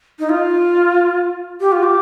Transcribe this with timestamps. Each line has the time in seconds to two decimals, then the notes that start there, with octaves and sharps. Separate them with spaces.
0.19 D#4
0.29 F4
1.60 G4
1.72 F4
1.83 G4